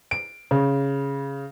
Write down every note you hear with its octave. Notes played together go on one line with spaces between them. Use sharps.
D7
C#3